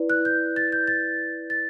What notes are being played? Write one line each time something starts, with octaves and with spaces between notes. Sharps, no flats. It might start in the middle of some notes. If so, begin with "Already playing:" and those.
Already playing: E4 B4 D5
F#6
G6
A6
G6
A6
A6